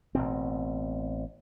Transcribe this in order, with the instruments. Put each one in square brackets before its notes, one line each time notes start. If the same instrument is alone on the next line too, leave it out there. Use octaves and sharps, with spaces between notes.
[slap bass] A1 B2 C4